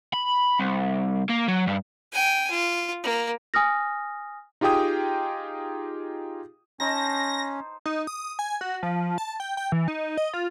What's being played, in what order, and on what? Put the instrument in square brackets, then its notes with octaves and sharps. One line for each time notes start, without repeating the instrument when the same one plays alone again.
[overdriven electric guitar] B5
C2
A#3
F#3
G2
[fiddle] G5 G#5
F4
A#3
[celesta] G#5 D#6 F6 A#6
[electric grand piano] D#4 F4 G4 G#4 G5 D#6
[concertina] C#4 [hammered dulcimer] D#4 C5 A5 [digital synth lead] A#6
[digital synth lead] D#4
D#6
G#5
F#4
F3
A5
G5
G5
E3
D#4
D#5
F4